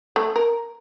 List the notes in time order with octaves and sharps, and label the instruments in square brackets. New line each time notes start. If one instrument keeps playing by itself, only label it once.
[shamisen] A3
A#4